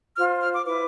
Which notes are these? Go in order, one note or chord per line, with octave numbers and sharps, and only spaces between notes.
F4 C5 F6
F6
D6
E4 B4 D6